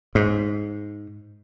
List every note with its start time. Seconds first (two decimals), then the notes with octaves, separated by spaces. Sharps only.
0.15 G#2